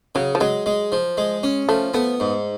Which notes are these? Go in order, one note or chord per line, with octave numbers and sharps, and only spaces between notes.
C#3 F#3
F3
F#3 G#3
G#3
F3
G#3
C#4
F3 A3
A3 B3
G#2